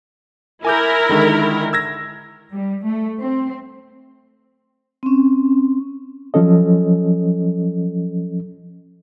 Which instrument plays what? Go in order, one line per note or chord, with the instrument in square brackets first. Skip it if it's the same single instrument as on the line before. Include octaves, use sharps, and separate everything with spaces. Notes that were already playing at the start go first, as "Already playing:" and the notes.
[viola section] E4 A#4 [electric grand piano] G#5 D6 G6
[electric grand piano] D3 D#3 G#3
E6 G#6 A#6
[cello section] G3
A3
C4
[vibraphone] C4 C#4
[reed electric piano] F3 F#3 C#4 A4 D#5